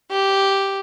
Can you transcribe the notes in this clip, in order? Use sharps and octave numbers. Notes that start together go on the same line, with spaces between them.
G4